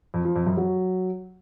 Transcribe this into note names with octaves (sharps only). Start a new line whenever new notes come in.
F2
F3
F2
F#2
F#3